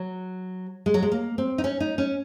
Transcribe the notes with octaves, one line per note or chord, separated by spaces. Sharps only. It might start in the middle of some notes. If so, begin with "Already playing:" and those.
Already playing: F#3
G#3
F#3
G#3
A#3
C4
D#4
C#4
D#4
C#4